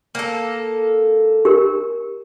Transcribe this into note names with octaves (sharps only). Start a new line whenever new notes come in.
A#3 A4
G4 A#4